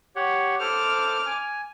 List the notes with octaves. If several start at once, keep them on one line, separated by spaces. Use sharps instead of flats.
G4 C#5 F#5
A4 C5 D6 F6
G#5